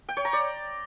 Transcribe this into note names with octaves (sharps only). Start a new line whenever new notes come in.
G5
C#5
A#5
D5